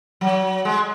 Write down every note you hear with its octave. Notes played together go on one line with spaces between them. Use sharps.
F#3
G#3